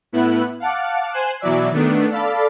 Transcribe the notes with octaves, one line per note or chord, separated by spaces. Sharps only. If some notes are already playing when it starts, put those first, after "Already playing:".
A2 B3 E4 F#6
F5 F#5 A5 D6
C5 G#5 F#6 C7 E7
B2 E3 F#3 D5 E5
D#3 A3 B3 D4
A4 D5 F5 B5